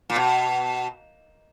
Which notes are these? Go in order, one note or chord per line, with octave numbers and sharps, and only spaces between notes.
A#2
B2